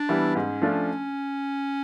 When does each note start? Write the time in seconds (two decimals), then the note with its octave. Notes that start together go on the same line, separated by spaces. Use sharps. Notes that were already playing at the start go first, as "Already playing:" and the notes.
Already playing: D4
0.09 E3 G3 B3 E4
0.35 G#2 C#4
0.62 F3 A3 D4 F4